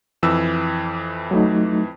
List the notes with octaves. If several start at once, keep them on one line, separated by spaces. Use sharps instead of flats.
F2 E3 E6
F#3 A3 D#4